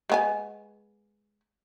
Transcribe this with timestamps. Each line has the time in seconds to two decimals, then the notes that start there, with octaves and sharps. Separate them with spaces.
0.10 G#3 B3 G#5